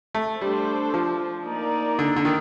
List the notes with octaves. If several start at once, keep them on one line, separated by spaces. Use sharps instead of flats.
A3
G3 A3 D4 A4 C5
F3
A#3 D#4 A#4 D5
D3
D3
D#3